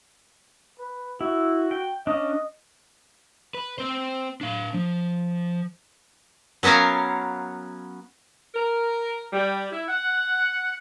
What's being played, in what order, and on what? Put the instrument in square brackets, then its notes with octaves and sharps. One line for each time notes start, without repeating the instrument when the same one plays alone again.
[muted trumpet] B4
[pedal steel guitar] E4 [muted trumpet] F#4
[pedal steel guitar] G5
[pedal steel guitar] C#4 D4 [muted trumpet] D#5
[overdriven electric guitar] B4
C4 C5
D4 F5
F3
[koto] F#3 B3 C#4 A#4 F5
[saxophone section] A#4
G3
E4
F#5